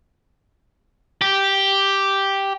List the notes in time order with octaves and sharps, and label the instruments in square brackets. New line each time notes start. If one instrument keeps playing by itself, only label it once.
[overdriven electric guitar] G4